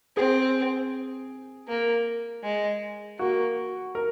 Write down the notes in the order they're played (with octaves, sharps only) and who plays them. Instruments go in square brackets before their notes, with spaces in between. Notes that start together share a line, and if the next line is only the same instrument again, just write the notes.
[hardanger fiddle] C4 [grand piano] G#4
[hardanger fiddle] A#3
G#3
[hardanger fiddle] A#3 [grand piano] F#4
[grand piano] A#4